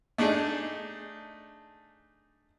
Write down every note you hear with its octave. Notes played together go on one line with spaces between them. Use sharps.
A3 D4 D#4 G#4